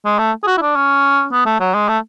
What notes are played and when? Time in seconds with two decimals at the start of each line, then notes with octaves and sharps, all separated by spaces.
0.05 G#3
0.19 A3
0.43 G#4
0.47 F#4
0.57 E4
0.61 D4
0.76 C#4
1.32 B3
1.46 A3
1.60 F#3
1.74 G#3
1.88 A3